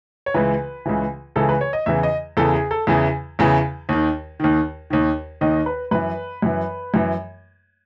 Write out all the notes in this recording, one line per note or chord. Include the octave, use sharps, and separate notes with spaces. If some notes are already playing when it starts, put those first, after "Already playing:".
C#5
C#2 C#3 E3 B4
C#2 C#3 E3
C#2 C#3 E3 A4
B4
C#5
D#5
E2 C#3 E3 E5
D#5
E2 C#3 E3 A4
G#4
A4
E2 C#3 E3
E2 C#3 E3
D#2 D#3
D#2 D#3
D#2 D#3
D#2 D#3 D#5
B4
F#2 E3 B4
F#2 E3
F#2 E3